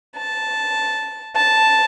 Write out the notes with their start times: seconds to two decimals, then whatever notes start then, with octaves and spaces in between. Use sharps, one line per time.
0.18 A5
1.35 A5